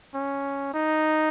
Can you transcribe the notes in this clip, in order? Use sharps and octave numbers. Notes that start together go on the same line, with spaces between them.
C#4
D#4